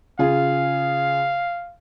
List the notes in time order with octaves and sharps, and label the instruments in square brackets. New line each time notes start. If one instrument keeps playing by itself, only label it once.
[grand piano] C#3 F4 G#4 [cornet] F5